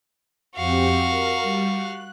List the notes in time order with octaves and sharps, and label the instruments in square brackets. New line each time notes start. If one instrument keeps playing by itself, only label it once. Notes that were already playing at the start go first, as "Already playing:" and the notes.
[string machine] F2 C4 G4 [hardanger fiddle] F#4 F5
[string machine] A#4
G3
F#6